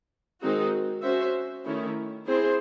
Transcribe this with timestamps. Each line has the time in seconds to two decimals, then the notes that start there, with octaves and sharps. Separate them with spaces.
0.40 D#3 G#3 C4 D#4 F#4
1.02 C#4 F#4 C5 E5
1.64 D#3 A3 C#4 E4
2.25 C4 E4 G#4 C5